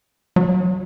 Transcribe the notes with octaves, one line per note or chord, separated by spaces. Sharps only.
F#3